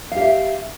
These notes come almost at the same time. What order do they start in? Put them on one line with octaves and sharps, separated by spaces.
F5 G4 E5